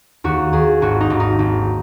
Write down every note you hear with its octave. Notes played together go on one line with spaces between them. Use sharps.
D#2 F#4
D#2 G#4
G#1 F#4
D#4
G#1
D#4
G#1